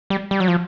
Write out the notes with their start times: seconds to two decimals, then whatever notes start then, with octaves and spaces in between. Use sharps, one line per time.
0.10 G3
0.31 G3
0.40 F#3
0.48 F3